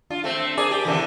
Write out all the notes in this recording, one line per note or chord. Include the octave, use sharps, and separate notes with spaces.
D4 F4
A3 C4
G#4 A#4 D5 A5
G4
B2 D3 E3